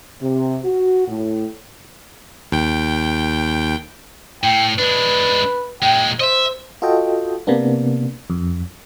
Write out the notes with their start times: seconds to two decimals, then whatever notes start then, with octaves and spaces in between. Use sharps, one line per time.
0.21 C3
0.64 F#4
1.07 A2
2.52 D#2 G5
4.44 A2 G5
4.79 G#3 D4 B4
5.82 A#2 G#3 G5
6.20 C5 D#5 E5
6.82 F4 F#4 A4 D#5 G5
7.47 C3 A#3 B3 D4
8.30 F2